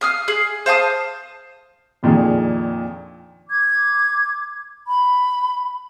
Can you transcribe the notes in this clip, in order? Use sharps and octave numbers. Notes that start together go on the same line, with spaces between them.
F5 D#6 F6
G#4
C5 F5 A5 D#6
F2 A#2 D#3 F3 D4 G#4
D6 G#6
B5